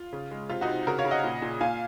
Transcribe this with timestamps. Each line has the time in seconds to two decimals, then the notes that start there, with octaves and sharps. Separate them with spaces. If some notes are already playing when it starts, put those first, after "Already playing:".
Already playing: F4
0.13 C#3
0.31 G#3
0.49 C3 F4
0.61 D#4 F#4
0.68 C3
0.87 C#3 F#4 A#4
0.98 C#5 F5
1.05 C#3
1.11 D#5 F#5
1.24 A#2
1.42 A#2
1.61 A#2 F5 G#5